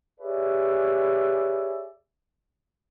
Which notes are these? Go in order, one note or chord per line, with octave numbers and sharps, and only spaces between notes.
G4 G#4 B4 C#5 D5 E5